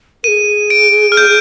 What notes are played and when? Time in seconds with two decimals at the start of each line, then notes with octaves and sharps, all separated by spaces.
0.24 G#4 A#4 D#7
0.70 D7
1.12 F6
1.17 G6